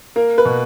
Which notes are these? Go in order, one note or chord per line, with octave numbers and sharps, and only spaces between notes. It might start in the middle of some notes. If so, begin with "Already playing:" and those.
A#3 A#4
B4
B2